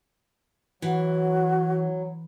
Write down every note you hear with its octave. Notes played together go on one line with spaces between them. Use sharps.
E3 F#3 F#4